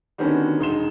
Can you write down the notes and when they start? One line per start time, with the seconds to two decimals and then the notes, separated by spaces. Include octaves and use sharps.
0.18 D3 D#3 G3 B3 C#4 F#4
0.59 E1 D#4 C6 E7